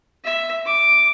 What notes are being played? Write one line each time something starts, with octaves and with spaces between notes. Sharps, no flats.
E5
D6